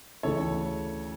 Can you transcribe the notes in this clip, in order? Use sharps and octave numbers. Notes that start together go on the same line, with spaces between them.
D2 C#3 E3 A4 C#5